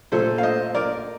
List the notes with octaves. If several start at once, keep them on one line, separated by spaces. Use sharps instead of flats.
A#2 A3 A4 C5
F5
C5 D#5
A#4 D5